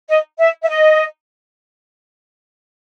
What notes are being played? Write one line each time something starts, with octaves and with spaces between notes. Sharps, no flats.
D#5
E5
E5
D#5